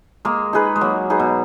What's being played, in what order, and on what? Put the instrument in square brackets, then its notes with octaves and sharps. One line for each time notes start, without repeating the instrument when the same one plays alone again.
[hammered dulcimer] G#3 [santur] A#3
[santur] D#4 G#4 B4
[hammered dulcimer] G#3
[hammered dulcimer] F#3 [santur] A#3
[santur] D#4 G#4 B4
[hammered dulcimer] B2